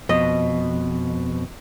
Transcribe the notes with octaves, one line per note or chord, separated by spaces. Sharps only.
F2 B2 D#5